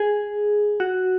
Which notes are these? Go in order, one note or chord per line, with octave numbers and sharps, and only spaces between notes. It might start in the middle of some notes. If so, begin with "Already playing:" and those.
Already playing: G#4
F#4